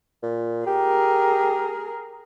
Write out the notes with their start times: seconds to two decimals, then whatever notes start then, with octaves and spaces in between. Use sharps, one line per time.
0.23 A#2
0.67 G4 G#4 A#4